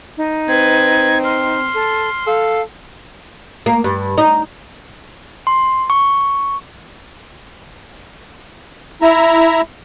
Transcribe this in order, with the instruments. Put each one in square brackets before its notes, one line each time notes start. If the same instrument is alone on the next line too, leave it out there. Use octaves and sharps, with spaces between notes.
[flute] D#4
[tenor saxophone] C4 [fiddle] B4 [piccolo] G#6
[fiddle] C6 [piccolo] F6
[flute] A4
[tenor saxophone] A4 [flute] F5
[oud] A#3
G2
D#4
[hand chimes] C6
C#6
[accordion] E4 E5 A#5